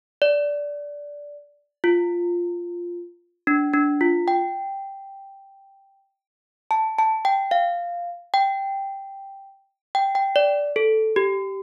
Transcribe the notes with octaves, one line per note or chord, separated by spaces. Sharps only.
D5
F4
D4
D4
F4
G5
A5
A5
G5
F5
G5
G5
G5
D5
A4
G4